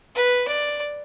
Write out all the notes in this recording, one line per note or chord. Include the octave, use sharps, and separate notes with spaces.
B4
D5